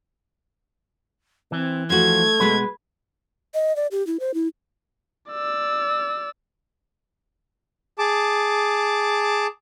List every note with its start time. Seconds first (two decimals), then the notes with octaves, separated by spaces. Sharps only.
1.52 E3 C4
1.90 F3 A3 F#4 G#6
2.40 B2 G#3 B4
3.54 D#5
3.76 D5
3.91 G4
4.07 E4
4.20 C5
4.34 E4
5.31 D5 E6
7.99 G#4 A5 D6